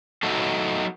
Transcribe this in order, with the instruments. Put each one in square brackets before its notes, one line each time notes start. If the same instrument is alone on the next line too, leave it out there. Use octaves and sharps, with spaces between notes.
[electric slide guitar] F#3 A3 D#4 F#4 A4